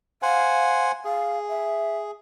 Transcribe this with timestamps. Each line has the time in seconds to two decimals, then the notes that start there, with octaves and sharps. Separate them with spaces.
0.22 C5 F5 F#5 G#5
1.05 G#4 F5
1.49 E5